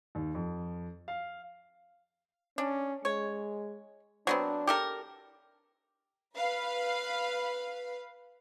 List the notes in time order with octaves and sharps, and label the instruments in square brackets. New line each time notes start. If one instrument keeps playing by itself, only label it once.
[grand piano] D#2
F2
F5
[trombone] C#4 [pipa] D4
[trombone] G#3 [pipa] C#5
[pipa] F#3 B3 C4 [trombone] D4
[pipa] G4 A4 A#4
[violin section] B4 F5